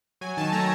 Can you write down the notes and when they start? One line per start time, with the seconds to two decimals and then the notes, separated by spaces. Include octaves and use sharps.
0.21 F#3 G#5
0.37 D#3 A5
0.53 A3 A#5